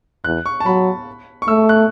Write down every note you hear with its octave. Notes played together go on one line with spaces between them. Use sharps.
E2 F#6
C#6
A5
F#3 B5
C#6
A3 E6
F#6